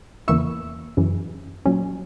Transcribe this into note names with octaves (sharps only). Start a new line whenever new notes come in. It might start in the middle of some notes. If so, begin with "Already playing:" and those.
E2 C#3 E3 A#3 E4 C#6 E6
F#2 C#3 E3
A#2 F#3 C#4